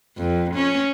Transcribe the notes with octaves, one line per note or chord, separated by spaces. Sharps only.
F2
C#4